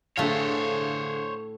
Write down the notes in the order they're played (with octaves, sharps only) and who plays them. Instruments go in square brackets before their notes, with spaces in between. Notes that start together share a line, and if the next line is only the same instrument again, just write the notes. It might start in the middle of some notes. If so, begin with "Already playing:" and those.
[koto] A2 A3 [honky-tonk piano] D3 G#4 F5 [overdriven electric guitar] C5 C#5